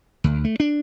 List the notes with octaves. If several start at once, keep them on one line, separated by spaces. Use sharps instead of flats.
D2
A3
D4